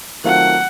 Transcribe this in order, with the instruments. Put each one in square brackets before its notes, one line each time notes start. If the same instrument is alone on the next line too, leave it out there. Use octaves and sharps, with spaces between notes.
[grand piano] D#3 F#3 A3 C4 F4 [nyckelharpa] F#5